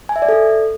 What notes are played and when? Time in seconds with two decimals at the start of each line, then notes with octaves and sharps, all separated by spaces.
0.09 G#5
0.16 E5
0.22 D5
0.29 A4